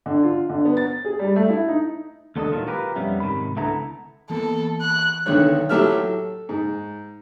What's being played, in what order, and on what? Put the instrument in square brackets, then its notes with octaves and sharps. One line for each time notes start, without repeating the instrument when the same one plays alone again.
[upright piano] D3
F4
D3
B3
A6
G#4
G3
A3
E4
D#4
[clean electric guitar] D#2 A3 B3 D4 A4 D#5
A#2 D#3 F#3 G#3 F4
F4 G4 A#4 B4
B1 F2 G3 B3 C#4 E5
G#2 C3 D#3 B5
C#2 D3 A3 B3 E4 A#5
[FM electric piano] E3 A#3 B3 [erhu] A4
[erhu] F#6
[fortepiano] B1 D3 D#3 C#5 F#6
A2 F#3 G4 A4 E5 F6
A4
G#2